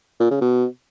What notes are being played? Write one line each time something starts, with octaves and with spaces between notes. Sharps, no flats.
A#2
C#3
B2